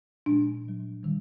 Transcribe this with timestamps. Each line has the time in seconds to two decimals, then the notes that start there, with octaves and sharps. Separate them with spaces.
0.26 A#2 F3 G#3 D4
0.64 A#2 F#3
1.03 D#3 G3